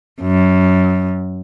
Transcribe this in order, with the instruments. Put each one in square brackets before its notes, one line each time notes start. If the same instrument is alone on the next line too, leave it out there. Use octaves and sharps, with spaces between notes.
[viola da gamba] F#2